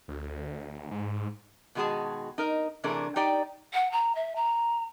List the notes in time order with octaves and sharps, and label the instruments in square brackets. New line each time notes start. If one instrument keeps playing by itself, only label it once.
[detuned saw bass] D2
G#2
[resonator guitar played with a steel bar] B2 D#3 G#3 F#4 G#4 A5
D#4 A#4 D#5
C3 E3 A3 D4 G#4 A#4
D#4 G4 D5 G5
[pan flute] F#5
A#5
E5
A#5